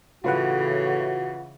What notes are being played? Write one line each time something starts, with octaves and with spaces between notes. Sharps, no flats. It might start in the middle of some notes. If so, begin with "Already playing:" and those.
A2 C#3 E3 F4 F#4 B4 F#5